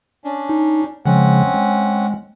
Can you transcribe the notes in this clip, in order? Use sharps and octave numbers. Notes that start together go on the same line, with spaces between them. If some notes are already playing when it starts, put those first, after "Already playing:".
C#4 D4
D#4
C#3 F3 G#3 C4 C#4 F#5
G#3